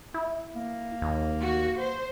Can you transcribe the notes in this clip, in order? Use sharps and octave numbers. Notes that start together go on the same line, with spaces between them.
E4
A#3
D#2
F#4
C5